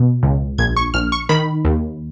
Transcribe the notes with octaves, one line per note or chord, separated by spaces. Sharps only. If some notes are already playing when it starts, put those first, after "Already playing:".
Already playing: B2
C#2
A#1 G#6
C#6
A#1 F6
C#6
D#3 B5
D#2